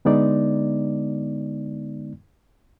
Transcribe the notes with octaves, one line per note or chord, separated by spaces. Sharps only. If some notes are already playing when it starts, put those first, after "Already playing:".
D3 G#3 B3 D#4 D5